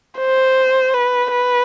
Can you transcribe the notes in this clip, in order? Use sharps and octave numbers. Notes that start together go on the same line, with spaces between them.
C5
B4
B4